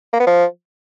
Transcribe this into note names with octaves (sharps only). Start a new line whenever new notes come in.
A#3
B3
F3